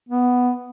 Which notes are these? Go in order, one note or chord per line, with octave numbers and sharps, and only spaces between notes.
B3